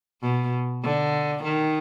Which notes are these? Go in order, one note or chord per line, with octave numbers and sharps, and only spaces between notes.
B2
D3
D#3